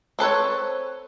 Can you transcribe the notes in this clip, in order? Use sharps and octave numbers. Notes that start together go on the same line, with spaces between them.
C4 A4 B4 C#5